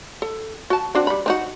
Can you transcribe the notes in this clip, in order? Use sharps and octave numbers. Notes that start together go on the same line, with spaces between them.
A4
F#4 A5
C4 D4 F#4
G3 B5
C4 D#4 F#4